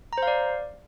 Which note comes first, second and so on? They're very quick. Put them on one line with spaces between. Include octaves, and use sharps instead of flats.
A#5 C5 F5 D5